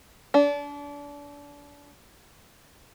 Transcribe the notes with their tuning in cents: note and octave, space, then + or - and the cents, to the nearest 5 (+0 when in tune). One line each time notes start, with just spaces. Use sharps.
D4 -30